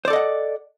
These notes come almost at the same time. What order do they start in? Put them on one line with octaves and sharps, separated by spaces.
C5 D5 A4 D#5 F#5